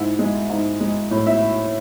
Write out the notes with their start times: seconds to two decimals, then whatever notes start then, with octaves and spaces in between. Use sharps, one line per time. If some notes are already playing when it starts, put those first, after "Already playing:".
Already playing: G#2 E4 E5
0.19 G#3
0.50 G#2
0.80 G#3
1.11 A2
1.26 E4 E5